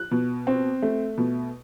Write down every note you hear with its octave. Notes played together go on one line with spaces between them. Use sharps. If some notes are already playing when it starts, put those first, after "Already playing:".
Already playing: F#6
B2
C4
A3
B2